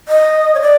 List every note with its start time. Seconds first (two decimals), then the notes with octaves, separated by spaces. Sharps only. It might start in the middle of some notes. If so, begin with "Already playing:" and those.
0.08 D#5
0.55 C#5
0.61 D5